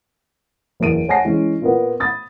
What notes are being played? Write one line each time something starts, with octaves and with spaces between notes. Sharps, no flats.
F#1 E2 A#4 D7 D#7
C#5 F#5 G#5 A5 A#6 C7
E3 G#3 C#4
A#2 A#3 B3
B5 D#6 A6